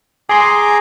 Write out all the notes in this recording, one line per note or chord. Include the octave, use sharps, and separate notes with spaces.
G#4 G#5 A#5 C6 D6